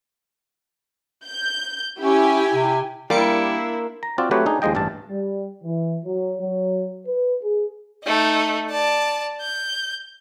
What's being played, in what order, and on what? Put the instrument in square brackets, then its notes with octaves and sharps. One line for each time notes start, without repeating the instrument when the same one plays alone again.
[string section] G6
[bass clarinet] C#4 [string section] E4 G4 G#5
[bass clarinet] C3
[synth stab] G3 D6 C#7 [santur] A#3 C6 [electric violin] D4 E4
[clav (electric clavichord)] A#5
C4 F4 F#4 D5
F#3 A3 C4 G4 B4 C#5
D4 D#4 G#4
D#2 F3 G#3 D#5 G5
A1 G2 D4 A5
[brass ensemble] G3
E3
F#3
F#3
B4
G#4
[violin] A3 D#4
D5 A5
G6